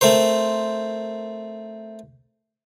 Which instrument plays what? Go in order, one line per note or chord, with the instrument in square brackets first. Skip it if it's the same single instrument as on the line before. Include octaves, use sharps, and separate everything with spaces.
[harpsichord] A3 C4 A#4 C5